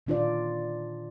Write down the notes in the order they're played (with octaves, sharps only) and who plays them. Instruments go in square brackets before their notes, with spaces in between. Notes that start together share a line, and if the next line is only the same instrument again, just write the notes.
[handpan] A#2 D#3 D4 F4 C5 D5